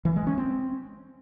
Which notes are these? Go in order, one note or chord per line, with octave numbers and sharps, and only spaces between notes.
E3
G#3
C#4
C4